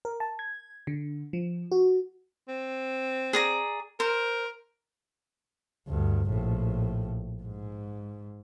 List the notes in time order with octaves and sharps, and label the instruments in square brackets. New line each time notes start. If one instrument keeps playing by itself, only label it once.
[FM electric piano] A#4
A5
G#6
D3
F3
F#4
[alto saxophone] C4
[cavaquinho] G#4 D5 A#5
[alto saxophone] A#4 [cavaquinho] C5
[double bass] D2 G2
A#1 A2
G#2